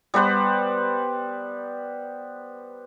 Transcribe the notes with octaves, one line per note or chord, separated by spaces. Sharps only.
G3 B3 B4 C5